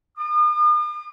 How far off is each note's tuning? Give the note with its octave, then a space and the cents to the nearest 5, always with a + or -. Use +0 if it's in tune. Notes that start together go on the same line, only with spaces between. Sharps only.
D#6 -45